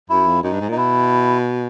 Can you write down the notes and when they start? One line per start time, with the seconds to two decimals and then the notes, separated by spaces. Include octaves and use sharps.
0.10 F#2 E4
0.27 F2
0.43 F#2 D#4
0.52 G2
0.61 G#2
0.69 A#2 D#4
0.77 B2 E4